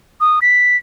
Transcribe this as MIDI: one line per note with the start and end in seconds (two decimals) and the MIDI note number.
0.21 0.40 87
0.42 0.77 95